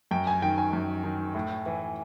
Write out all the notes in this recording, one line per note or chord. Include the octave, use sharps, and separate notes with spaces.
F#2 G5
G#5
D#3 G5
G#5
F#2
D#3
A2
E3